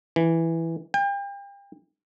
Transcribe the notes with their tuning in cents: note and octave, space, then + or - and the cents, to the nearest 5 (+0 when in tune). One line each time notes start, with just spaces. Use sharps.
E3 +0
G5 +35